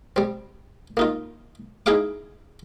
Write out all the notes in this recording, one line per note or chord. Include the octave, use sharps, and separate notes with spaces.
G3 C4
A#3 D#4 F4
D#4 E4 G#4 E5 F5 D6